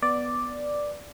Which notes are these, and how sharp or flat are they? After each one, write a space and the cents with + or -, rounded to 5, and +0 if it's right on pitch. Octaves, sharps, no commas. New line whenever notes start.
B3 +0 D5 +0